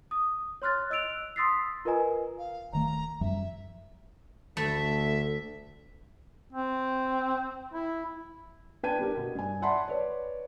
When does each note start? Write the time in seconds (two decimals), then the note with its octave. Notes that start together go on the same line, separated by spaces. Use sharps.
0.11 D#6
0.62 C#5 C6 F6 F#6 A6
0.90 D#5 E6 F#6 D7 F7
1.36 C6 D#6 E6 A6 B6 C7
1.85 F4 A#4 B4 D#5 G#5 A#5
2.38 F5
2.73 D#1 D#3 A3 A#5
3.21 F#2 F3 G3 E5
4.57 D2 A3 E5
6.53 C4
7.74 E4
8.83 D4 B4 G5 A5 G#6 D#7
8.99 D4 G4 A#4
9.17 B2
9.35 G2 G#5
9.62 D5 E5 F#5 A5 B5 C6
9.88 B4 C#5 D5